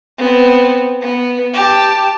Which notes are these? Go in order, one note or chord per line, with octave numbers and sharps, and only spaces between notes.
B3 C4
B3
G4 A5